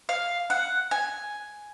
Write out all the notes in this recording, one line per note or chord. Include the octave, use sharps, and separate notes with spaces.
F5
F#5
G#5